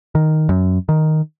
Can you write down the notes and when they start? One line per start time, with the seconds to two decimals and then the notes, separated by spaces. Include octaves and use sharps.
0.15 D#3
0.49 F#2
0.89 D#3